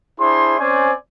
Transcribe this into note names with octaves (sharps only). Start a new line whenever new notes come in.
D4 E4 G#4 C5 C6
C4 C#4 C5 D5 G#5